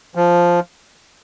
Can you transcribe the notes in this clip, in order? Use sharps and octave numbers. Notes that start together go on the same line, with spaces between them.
F3